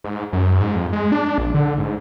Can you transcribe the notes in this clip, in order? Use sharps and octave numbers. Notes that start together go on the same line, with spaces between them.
G#2
F#2
G#2
F2
G#3
D4
A#1
D3
G#2